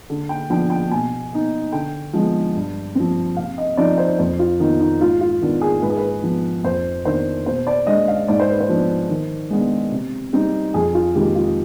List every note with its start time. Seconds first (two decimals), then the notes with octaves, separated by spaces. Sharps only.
0.10 D3
0.29 G5
0.50 F3 B3 D4 G5
0.70 G5
0.90 B2 G#5
1.33 B3 D#4
1.72 D3 G5
2.13 F3 G#3 B3
2.56 G2
2.95 F3 C4
3.37 C3 F5
3.58 D#5
3.77 F3 C4 D#4 D5
3.98 C5
4.19 F2 C5
4.39 F4
4.60 D#3 B3 D#4
4.81 D#4
5.01 G#2 F4
5.21 F4
5.42 D#3 B3 D4
5.61 G#4
5.82 G#2 B4
5.90 G#4
5.97 B4
6.23 F3 B3
6.64 F2 C5
7.05 D#3 B3 D4 C5
7.46 B2 C5
7.67 D5
7.87 G#3 D4 D#5
8.08 F5
8.28 G#2 D5
8.40 C5
8.50 B4
8.60 C5
8.69 F3 B3 D4
9.10 D#3
9.51 G#3 B3 D4
9.92 C3
10.33 G3 C4 D#4
10.74 F2 G#4
10.95 F4
11.15 C3 D#3 G#3 G4
11.35 F4